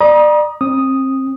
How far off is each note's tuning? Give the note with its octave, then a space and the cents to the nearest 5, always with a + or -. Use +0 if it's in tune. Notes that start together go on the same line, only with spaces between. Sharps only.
D5 +30 A#5 +40 D#6 +0
C4 +30 D#6 +0